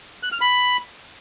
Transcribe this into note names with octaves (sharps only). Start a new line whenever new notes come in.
F#6
F6
B5